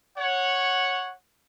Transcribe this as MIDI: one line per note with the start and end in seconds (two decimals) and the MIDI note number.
0.17 1.13 73
0.17 1.13 78